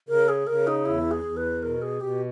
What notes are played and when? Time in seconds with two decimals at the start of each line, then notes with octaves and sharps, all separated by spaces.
0.08 C#3 A#4
0.29 G#4
0.47 C#3 A#4
0.67 D#4
0.85 E2 E4
1.11 G#4
1.24 E2
1.37 B4
1.62 B2 A#4
1.82 G#4
2.01 B2 G4